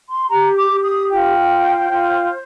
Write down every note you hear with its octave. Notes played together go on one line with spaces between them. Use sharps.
C6
G4 A#5
D6
G4
D#6
F4 G5
C5
F4